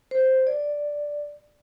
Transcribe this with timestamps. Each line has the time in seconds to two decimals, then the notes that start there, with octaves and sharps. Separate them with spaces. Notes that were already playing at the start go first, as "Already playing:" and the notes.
0.11 C5
0.47 D5